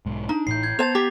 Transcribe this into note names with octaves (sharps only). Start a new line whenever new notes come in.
B1 G#2
D4 D#4 A#5
A1 A2 G6 C7
G6 G#6
B3 C5 A5 A6 F7
G4 D6 B6